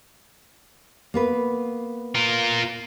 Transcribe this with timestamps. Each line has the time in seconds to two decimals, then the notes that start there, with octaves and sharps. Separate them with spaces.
1.14 A#3 B3 B4
2.15 F4 A#4